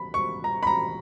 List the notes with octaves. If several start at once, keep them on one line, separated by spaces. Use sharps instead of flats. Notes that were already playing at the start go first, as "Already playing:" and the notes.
Already playing: B5
C#6
A#5
B5
A#5